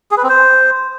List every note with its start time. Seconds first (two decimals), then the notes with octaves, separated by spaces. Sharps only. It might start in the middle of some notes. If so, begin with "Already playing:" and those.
0.11 G#4
0.17 B4
0.23 C4
0.29 C5